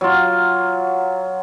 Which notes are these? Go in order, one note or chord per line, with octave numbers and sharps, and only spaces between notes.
F#3 F4